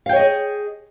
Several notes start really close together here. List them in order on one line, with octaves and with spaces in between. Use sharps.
F5 G5 C#5 D#5 G#4